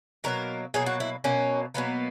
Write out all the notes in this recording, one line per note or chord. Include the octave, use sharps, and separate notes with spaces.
B2 F#3 A#3 A#4
B2 F#3 A#3 G#4
F#4
E4
B2 F#3 A#3 C#4
B2 F#3 A#3 B3